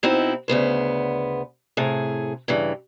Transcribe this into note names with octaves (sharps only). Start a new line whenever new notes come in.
B2 C4 D#4 E4
D2 C#3 B3 C5
A2 C3 G#4
G2 C#3 E3